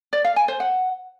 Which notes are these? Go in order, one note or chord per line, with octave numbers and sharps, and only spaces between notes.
D5
F5
G#5
C5
F#5